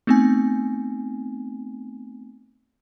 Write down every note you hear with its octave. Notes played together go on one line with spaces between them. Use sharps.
A3 B3 C4 D#4 G#5